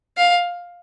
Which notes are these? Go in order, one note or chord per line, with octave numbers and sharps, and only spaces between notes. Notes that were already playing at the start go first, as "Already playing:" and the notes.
F5